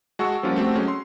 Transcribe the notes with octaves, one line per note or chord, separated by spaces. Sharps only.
G#3 F#4 A5 C#6 E6
F3 G3 A#3 C#4 F4 F#4
A3 C4 F#4 G4
F#3 G#3 C#4
C6